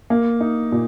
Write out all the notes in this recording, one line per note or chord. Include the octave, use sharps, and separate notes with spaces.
A#3
D#4
A#2